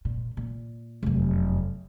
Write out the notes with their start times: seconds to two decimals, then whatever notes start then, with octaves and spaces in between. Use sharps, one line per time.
0.05 A#2
0.37 A#2
1.03 F1 F#2